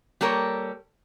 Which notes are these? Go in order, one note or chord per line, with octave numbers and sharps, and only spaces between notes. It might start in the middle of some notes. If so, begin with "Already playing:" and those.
G3 A#3 A4 A#4 C#5